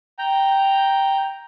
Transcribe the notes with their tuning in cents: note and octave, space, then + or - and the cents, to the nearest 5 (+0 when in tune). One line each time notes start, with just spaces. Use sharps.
G5 +0 A#5 +0